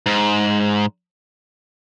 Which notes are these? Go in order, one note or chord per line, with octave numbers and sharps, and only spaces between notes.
G#2